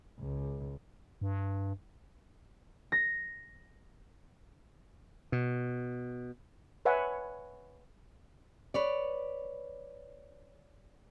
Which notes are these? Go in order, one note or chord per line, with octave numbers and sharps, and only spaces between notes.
C#2
G2
A#6
B2
B4 C#5 E5 F#5 G#5 C#6
B4 C#5 D5